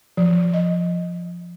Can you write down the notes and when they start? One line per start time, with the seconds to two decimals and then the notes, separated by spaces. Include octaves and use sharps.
0.17 F3
0.54 D#5